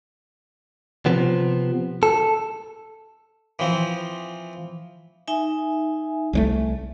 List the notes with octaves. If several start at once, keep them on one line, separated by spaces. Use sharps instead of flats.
C3 F3 B3
A4
E3 F3 C4
D#4 E5 G#5
C2 G3 A3